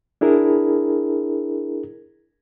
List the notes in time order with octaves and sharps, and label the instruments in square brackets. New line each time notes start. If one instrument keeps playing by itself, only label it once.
[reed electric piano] D4 E4 G#4 A#4